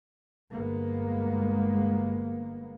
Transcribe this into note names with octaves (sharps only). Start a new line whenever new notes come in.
G1 G#3 A#3 B3